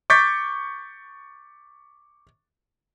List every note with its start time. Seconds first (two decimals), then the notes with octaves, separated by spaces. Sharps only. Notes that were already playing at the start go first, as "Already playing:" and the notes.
0.10 C#6 D6 G6 A6 B6